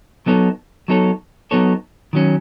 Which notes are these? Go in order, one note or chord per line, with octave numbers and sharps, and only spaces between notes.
F#3 B3 D#4 A4 C#5
F#3 B3 D#4 A4 C#5
F#3 B3 D#4 A4 C#5
D#3 F#3 C#4